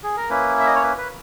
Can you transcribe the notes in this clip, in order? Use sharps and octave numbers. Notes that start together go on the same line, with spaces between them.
G#4
A#4
A#3 C#4 E4 B4
E5
D#5
C#5
B4
B4